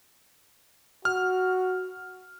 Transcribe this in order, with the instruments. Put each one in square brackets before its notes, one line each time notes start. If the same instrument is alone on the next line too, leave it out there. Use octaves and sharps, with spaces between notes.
[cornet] F#4 [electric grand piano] F6